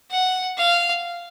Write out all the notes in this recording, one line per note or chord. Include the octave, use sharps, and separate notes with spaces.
F#5
F5